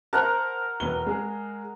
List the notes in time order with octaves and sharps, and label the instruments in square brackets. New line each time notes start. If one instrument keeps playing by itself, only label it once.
[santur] A#4 F#5 A#5 [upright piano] C5 A5
[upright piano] E1 B4 G7
G#3 G#4